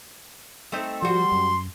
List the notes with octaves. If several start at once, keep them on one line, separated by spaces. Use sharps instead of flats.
A3 C4 D#4
F3 G3 F#4 C6
F#2